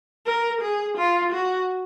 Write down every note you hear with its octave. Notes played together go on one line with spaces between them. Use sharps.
A#4
G#4
F4
F#4